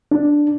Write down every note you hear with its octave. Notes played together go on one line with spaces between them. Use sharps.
D4